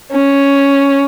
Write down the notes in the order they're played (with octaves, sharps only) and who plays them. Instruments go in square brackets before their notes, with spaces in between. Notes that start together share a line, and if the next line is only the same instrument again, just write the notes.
[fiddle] C#4